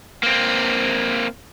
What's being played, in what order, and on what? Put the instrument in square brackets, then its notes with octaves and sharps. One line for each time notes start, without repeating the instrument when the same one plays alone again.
[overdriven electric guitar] A#3 C4